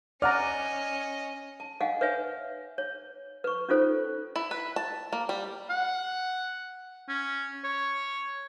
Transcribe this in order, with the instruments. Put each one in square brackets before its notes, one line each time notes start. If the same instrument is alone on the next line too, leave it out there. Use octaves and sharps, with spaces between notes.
[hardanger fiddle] C#4 D#5 [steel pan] D5 F#5 A#5 [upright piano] F6
[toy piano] A5
D#5 F5 F#5 G#5
B4 C#5 E5 G#5
C#5
B4 C#6
C#4 D#4 F4 A4 C5
[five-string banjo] E4
B4
A5
A#3
G3
[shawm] F#5
C#4
C#5